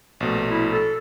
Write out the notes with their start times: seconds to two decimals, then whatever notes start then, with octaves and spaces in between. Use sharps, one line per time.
0.20 A#1 B2 A3
0.50 E4
0.72 A4